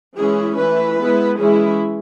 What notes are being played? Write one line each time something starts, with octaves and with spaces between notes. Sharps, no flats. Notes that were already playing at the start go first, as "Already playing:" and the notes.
E3 G#3 C#4 E4 G#4
E3 A3 E4 B4
G#3 B3 E4
E3 G#3 C#4 E4 G#4